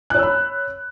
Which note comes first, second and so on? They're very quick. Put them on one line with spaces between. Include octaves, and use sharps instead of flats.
F#6 C#5 E6 B5